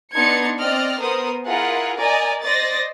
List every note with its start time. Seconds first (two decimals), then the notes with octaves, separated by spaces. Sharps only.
0.14 B3 D4 D#4 C6 G#6 C#7
0.58 C4 D5 D#5 F6
1.01 B3 A#4 C5 D#6
1.46 E4 F4 G#4 A#4 F#5
1.98 A#4 D5 D#5 G#5 A#5
2.44 C5 D5 D#5 A6 A#6